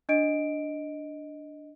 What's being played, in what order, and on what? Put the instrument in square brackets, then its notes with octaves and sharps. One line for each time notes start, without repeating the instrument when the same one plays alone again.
[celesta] D4 D#5 D7